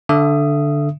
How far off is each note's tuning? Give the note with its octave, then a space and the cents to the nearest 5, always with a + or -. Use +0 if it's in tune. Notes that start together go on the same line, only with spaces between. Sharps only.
D3 +0 E5 +25 D#6 +0